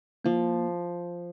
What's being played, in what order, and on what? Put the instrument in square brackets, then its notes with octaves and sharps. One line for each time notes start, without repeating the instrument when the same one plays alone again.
[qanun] F3 [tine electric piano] A#3